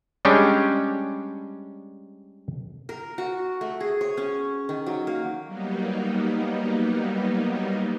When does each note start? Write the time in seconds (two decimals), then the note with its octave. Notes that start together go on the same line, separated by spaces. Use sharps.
0.25 G3 G#3 C#4 D4 C#5 G5
2.89 A#4
3.18 F#4
3.61 A3
3.80 G#4
4.01 C#5
4.17 C#4
4.69 D#3
4.86 F#3
5.07 A#3
5.45 F#3 G3 A#3 B3 D#4